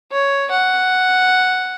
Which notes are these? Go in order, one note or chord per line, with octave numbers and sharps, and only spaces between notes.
C#5
F#5